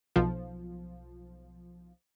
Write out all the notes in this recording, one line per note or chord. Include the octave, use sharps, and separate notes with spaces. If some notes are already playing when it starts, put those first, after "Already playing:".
B1 F3